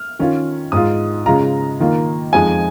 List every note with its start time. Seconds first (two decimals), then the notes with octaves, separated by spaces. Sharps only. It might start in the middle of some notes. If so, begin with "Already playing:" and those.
Already playing: F6
0.19 D#3 C#4 F4
0.72 G#2 G#3 F4 D#6
1.26 C#3 G#3 F4 A#5
1.80 D#3 A#3 F4
2.33 F2 F3 G#3 D#4 G#5